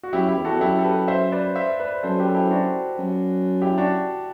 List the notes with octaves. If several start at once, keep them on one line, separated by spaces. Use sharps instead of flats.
F#4
F#2 E4 G4
E4 G4
E2
F#4 A4
E2
F#2 E4 G4
A4
G4 B4
C5 E5
B4 D5
C5 E5
B4 D5
F#2 A4 C5
G4 B4
A4
E4 G4
D4 F#4
F#2
E4 G4
D4 F#4